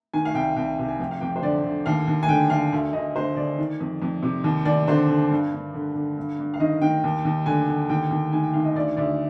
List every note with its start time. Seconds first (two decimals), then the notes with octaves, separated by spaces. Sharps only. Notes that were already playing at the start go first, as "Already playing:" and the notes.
0.14 D#3 G#5
0.25 F5
0.34 C2 G5
0.56 C2 G5
0.79 C3
0.88 G#5
1.00 F2 G5
1.11 F5
1.21 F2 G5
1.36 C5
1.42 D3 D5
1.64 D3
1.86 D#2 F5
2.07 D#2
2.23 G#5
2.28 D3 G5
2.50 D3 F5
2.73 D2
2.93 D2 D#5
3.16 D3 C5
3.36 D3 D5
3.59 D#3
3.80 F2
4.02 F2
4.23 C3
4.44 D#2
4.65 D#2 D5
4.87 D3 C5
5.10 D3
5.31 G2
5.53 G2
5.74 D3
5.95 D3
6.17 G2
6.39 G2
6.54 F5
6.60 D#3 D#5
6.82 D#3 G5
7.04 D#2
7.25 D#2
7.46 D3 G#5
7.68 D3
7.89 D#2 G5
8.11 D#2
8.33 D#3 G#5
8.43 G5
8.53 D#3 F5
8.64 D#5
8.75 D2 D5
8.97 D2 D5